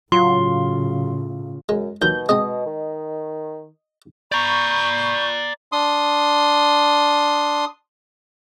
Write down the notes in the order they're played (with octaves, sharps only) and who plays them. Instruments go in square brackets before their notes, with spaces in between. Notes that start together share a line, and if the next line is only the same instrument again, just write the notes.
[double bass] A2 C#3 [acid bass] F#3 [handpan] F4 [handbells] C6
[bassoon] F#2 [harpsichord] G#3
[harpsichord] D#2 F#3 A#4 [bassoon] B2 [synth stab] G6
[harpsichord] G#3 B3 C4 [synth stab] D#5
[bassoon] D#3
[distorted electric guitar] D5 A#5 [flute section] B5 C#6 [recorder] G6
[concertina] D4 C6 D#6